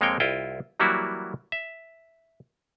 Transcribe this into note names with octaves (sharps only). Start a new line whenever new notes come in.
F2 G#3 A#3 C4 C#5 G5
C2 E4 F4 D#5 G5
E3 F#3 G3 A#3 E4 F#4
E5